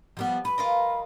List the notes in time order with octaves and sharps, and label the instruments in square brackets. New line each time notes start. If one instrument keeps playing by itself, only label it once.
[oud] F3 G3 B3
[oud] B4 [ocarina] B5
[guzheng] F4 A#4 D#5